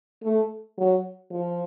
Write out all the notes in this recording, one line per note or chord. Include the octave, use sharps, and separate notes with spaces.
A3
F#3
F3